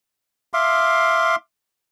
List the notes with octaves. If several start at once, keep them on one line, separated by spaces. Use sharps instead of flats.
E5 F5 C6 D6